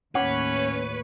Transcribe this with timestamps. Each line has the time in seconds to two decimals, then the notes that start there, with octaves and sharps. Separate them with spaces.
0.15 D#2 A2 C#4 B4 C#5 F#5 D6